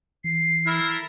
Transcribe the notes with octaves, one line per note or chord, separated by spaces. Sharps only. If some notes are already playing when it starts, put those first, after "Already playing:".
E3 C7
E4 A4 A#4